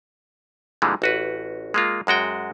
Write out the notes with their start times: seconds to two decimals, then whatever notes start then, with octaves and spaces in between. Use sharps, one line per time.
0.82 A#2 D3 E3 G3 G#3
1.02 A1 F#4 B4
1.74 G#3 A#3 F4
2.07 F#2 G#3 F#4 G5